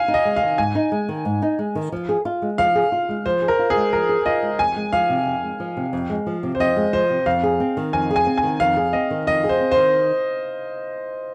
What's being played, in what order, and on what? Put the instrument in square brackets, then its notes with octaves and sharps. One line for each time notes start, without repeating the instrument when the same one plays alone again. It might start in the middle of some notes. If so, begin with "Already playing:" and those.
Already playing: [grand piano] F5 G#5
[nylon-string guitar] D#4
[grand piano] D#5
[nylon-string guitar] G#3
[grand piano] F5
[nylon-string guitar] D#3
[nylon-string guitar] G#2 [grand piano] G#5
[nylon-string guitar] D#4
G#3
D#3
G#2
D#4
G#3
D#3
F3
G#4
F4
G#3
[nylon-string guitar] F3 [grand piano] F5
[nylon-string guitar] G#4
F4
G#3
[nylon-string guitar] F3 [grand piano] C5
[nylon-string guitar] G#4
[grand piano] A#4
[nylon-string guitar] F4
[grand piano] G#4
[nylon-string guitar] G#3
[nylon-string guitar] F3 [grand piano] A#4
[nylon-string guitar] G#4
[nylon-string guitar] F4 [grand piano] D#5
[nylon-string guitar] G#3
[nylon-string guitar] F2 [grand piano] G#5
[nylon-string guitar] G#3
[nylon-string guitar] F3 [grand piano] F5
[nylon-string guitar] C3
F2
G#3
F3
C3
F2
G#3
F3
C3
[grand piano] C5
[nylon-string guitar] F2 [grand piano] D#5
[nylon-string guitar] G#3
[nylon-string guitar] F3 [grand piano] C5
[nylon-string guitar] C3
[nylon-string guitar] F2 [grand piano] F5
[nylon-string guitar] G#4
C4
D#3
[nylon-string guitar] F2 [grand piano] G#5
[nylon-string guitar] G#4
[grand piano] G#5
[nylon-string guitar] C4
[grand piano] G#5
[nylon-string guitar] D#3
[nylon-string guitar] F2 [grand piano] F5
[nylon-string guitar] G#4
[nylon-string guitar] C4 [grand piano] D#5
[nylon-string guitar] D#3
[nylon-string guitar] F2 [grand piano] D#5
[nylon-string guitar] G#4
[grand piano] C5
[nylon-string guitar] C4
[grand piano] C5
[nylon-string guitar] D#3